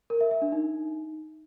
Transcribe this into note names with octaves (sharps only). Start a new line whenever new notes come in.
A#4
E5
E5
D4
D#4